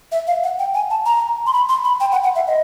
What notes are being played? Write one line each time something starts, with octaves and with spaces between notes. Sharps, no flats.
E5
F5
F#5
G5
G#5
A5
A#5
C6
B5
C6
B5
G5
F#5
F#5
E5
D#5